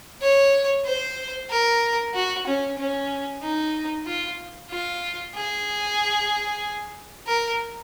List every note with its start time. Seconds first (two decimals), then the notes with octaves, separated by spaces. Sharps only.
0.22 C#5
0.85 C5
1.50 A#4
2.14 F#4
2.47 C#4
2.79 C#4
3.42 D#4
4.06 F4
4.71 F4
5.35 G#4
7.27 A#4